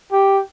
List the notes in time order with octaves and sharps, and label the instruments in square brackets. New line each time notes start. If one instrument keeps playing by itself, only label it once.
[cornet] G4